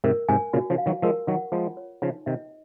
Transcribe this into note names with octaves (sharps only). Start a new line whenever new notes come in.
G#2 C3 A#4
G#2 C3 G#5
A#2 C#3 F#4
C#3 F3
F5
D#3 F#3
F3 G#3 A#4
D#3 F#3 F#5
F3 G#3 F4
C#5
C#3 F3 D#4
C3 D#3 D#5